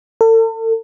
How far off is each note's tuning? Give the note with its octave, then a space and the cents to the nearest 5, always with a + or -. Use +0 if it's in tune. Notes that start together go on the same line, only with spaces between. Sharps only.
A4 +40